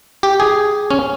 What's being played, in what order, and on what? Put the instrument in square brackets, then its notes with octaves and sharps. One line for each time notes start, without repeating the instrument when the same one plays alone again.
[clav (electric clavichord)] G4
G#4
C#4